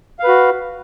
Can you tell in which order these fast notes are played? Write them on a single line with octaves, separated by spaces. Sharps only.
F5 B4 F#4